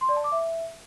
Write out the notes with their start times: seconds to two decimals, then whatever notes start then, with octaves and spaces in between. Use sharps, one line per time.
0.01 C6
0.09 D5
0.16 A5
0.24 D6
0.32 E5